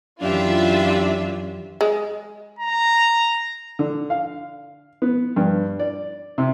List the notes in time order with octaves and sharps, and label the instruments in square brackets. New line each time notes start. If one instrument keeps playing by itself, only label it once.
[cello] F#2 [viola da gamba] E3 G4 [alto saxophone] D4 [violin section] F4 E5
[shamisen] G#3
[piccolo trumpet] A#5
[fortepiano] D3
F5
B3
G2
D5
C3